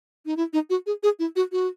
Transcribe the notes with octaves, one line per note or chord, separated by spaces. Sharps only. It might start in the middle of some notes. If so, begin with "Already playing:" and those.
D#4
E4
D#4
F#4
G#4
G#4
E4
F#4
F#4